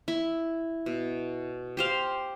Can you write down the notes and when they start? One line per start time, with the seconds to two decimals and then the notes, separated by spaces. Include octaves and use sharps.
0.08 E4
0.86 B2
1.77 G4 C5 F5